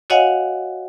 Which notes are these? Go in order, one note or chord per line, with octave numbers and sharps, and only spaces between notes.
F#4 C#5 D#5 F5 F#5 G#5